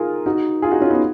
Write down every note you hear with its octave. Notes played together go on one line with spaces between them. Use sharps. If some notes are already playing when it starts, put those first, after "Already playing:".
Already playing: D#4 F4 G#4 A#4
D#4 F#4
F4 G#4
D#4 F#4
C#4 F4
B3 D#4